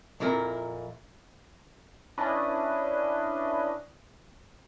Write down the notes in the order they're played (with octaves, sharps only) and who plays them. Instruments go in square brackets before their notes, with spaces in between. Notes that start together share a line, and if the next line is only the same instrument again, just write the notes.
[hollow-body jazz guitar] F2 A#2 E4 A#4
[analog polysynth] C#4 D4 E4 B4 D#5